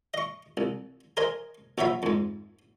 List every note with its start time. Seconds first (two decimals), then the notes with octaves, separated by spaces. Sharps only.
0.14 D#5 C#6
0.57 C2
1.17 A#4 C5 D#5 G#5
1.78 A#1 F3 F#3 E5 B5
2.03 F2 G#2